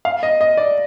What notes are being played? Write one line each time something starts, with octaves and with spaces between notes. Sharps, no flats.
F5
D#5
D#5
D5